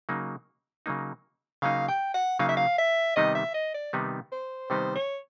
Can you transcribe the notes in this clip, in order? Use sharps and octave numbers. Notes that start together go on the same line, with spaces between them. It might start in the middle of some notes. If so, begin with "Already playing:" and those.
C#3 F#3 A#3 D#4
C#3 F#3 A#3 D#4
C#3 F#3 A#3 D#4 F5
G5
F#5
C#3 F#3 A#3 D#4 F5
E5
F5
E5
C3 D#3 G3 B3 D#4 D#5
E5
D#5
D5
C3 D#3 G3 B3 D#4
C5
C3 D#3 G3 B3 D#4 C5
C#5